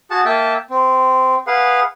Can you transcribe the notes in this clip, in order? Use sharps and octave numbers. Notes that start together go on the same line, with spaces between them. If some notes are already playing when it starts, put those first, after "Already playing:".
F#4 G#4 F#5 A5
A#3 E5 G5 A5
C4
G#4 B4 F5 F#5